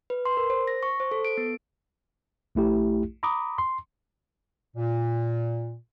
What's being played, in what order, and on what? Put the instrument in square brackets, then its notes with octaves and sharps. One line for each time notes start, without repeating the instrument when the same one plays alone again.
[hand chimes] B4
C6
A#4
C5
A#6
C#6
C5
A4
D7
B3
[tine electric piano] A#1 A3 E4 G4
A#5 B5 D6 D#6
C6
[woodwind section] A#2